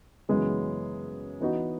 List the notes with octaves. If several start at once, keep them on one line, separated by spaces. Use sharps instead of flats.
F#2 C#3 E3 G#3 B3
E3 B3 D#4 F#4